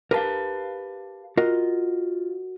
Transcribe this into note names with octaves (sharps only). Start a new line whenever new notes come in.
G4 A#4 B4 F5 A5
F4 F#4 A#4 D#5